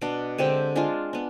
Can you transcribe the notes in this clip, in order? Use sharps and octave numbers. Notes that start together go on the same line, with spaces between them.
B2 B3 D4
D3 G#3 C4 G4
G#3 D4 F4
B3 D4